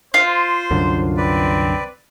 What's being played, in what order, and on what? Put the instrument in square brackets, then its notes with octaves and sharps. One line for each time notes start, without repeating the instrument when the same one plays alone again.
[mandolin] F4 [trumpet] C5
[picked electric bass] C2 F#2 D3
[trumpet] C4 [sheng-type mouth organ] B4 D5